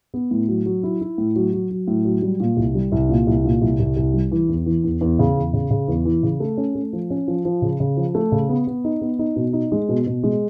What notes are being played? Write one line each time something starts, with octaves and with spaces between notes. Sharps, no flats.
B3
A2
F#3
F#3
E4
E4
A2
F#3
F#3
F#3
A2
F#3
G3
A#2
C2
G3
C2
A#2
C2
A#2
C2
C2
C2
G3
E3
E2
E3
E2
E2
C#3
E2
C#3
C#3
E2
E3
C#3
A3
C#4
A3
F3
C#4
F3
F3
C#3
C#3
F3
A3
C#3
B3
B3
D#4
B3
D#4
B2
D#4
G#3
B2
B2
G#3